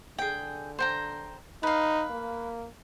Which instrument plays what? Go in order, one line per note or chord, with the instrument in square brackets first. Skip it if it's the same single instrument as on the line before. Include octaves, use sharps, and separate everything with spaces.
[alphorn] D3 [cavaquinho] G#4 G5
[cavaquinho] C5 G5 A#5
[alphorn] D#4 [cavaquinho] B4 F5
[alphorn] A#3